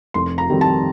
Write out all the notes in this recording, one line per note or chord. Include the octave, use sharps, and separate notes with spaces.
F1 C6
A#5
F2 D#3 G3 C4
A5